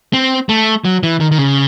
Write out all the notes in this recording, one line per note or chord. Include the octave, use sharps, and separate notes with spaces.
C4
A3
F#3
E3
D#3
D#3
C#3